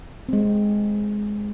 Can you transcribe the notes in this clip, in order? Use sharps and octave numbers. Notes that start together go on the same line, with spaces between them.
G#3 C4